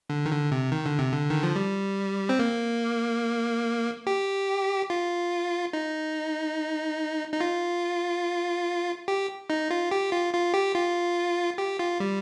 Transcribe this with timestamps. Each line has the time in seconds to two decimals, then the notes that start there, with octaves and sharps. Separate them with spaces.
0.10 D3
0.25 D#3
0.31 D3
0.51 C3
0.72 D#3
0.86 D3
0.99 C3
1.13 D3
1.30 D#3
1.43 F3
1.56 G3
2.29 C4
2.39 A#3
4.07 G4
4.90 F4
5.73 D#4
7.33 D#4
7.40 F4
9.08 G4
9.50 D#4
9.71 F4
9.91 G4
10.12 F4
10.34 F4
10.54 G4
10.75 F4
11.58 G4
11.79 F4
12.00 G3